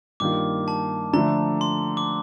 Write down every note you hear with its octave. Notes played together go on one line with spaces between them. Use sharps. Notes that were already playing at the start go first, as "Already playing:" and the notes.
G2 D#3 A#3 F4 D6
A5
D3 F3 A3 A#5
C6
D6